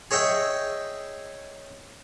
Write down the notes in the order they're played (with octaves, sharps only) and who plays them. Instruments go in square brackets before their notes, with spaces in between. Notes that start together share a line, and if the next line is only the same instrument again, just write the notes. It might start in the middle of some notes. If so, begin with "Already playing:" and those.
[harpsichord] G#4 C#5 D#5 E5 G5